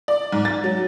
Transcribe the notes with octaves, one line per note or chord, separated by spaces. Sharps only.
D5
G#2
A6
F#3